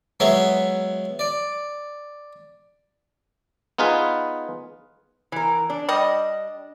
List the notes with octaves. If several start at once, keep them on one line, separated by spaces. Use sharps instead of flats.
F#3 G#3 B3 C#5 E5
D5
B3 D#4 F4 G#4 B4
E3 A#4
D4
G3 D#5